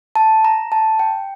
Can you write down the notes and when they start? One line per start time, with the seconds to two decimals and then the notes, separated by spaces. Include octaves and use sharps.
0.16 A5
0.45 A#5
0.72 A5
0.99 G5